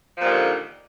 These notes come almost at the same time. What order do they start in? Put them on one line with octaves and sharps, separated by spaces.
F3 A#2 D#3 G3 D3